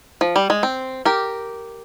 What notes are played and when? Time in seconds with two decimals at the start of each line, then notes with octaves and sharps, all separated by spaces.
0.21 F3
0.36 G3
0.50 G#3
0.63 C4
1.05 G4 A#4